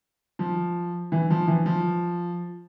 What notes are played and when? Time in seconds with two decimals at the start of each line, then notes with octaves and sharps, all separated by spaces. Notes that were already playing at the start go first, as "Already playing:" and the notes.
0.39 F3
1.12 E3
1.30 F3
1.48 E3
1.66 F3